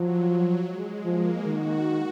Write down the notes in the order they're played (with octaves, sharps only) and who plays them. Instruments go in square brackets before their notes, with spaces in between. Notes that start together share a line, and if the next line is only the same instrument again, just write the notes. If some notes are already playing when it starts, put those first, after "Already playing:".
Already playing: [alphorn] F3 [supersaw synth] F#3
[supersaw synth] G#3
[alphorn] F3 [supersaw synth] A#3
[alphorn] D#3 [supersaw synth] F#4